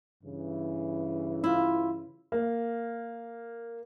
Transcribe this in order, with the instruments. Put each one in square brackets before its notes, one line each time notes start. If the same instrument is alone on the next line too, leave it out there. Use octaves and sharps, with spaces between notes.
[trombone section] G2 C#3 E3
[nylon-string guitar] E4 F4
[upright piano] A#3